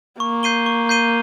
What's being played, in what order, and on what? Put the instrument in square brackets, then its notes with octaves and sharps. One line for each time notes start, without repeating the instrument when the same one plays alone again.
[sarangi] A#3 [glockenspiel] C#6
[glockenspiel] G6 C7 D#7 G7
C#6
G6 C7 D#7 G7